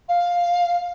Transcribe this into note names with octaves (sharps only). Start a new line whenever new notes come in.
F5